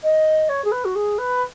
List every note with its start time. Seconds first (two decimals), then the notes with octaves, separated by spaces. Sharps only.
0.03 D#5
0.49 C#5
0.64 G#4
0.71 B4
0.84 F#4
0.95 G#4
1.18 B4